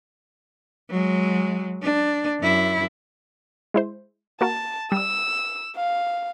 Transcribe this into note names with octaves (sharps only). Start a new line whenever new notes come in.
F#3 G#3
D4
F#2 E4
G#3 E4 C5
A#3 F#4 A#4 A5
G3 E6
F5